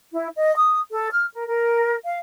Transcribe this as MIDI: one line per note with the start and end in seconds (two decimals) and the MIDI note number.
0.12 0.29 64
0.36 0.54 75
0.55 0.78 87
0.90 1.07 69
1.10 1.26 89
1.33 1.46 70
1.47 1.95 70
2.05 2.18 77